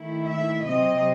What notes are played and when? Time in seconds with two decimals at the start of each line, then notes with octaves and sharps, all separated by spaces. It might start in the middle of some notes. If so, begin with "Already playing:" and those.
Already playing: D#3 A3 E4
0.28 E5
0.65 C3 F#3 C4 D#5